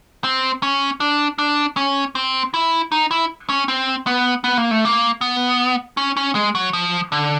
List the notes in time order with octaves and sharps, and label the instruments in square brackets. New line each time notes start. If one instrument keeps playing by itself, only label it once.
[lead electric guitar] C4
C#4
D4
D4
C#4
C4
E4
D#4
E4
C#4
C4
B3
B3
A#3
A3
A#3
B3
C#4
C#4
G#3
F#3
F3
D3